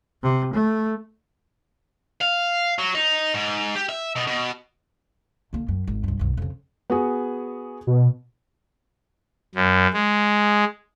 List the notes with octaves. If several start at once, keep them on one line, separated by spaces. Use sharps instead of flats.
C3
A3
F5
F#3
D#4
G#2
G4
E5
B2
B2
D3 A#3
F#2
G#1
C#2 G2
B1 F#2
F2 C#3
B3 F#4 G#4
B2
F#2
G#3